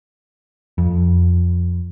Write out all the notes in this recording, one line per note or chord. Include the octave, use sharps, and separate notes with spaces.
F2